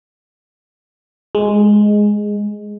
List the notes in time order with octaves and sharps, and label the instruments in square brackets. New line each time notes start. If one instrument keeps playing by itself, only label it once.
[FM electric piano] G#3